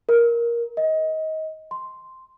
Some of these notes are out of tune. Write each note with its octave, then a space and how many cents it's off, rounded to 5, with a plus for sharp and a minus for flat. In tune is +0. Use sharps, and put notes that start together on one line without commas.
A#4 +10
D#5 +25
C6 +0